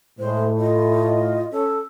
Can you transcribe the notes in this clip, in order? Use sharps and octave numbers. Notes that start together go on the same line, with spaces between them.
A2 G#3 C5
F4 D#5
C#4 A4